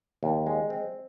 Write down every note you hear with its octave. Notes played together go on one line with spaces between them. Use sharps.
D#2
G#3
C4